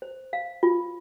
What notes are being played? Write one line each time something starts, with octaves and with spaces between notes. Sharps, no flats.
C5
F5
F4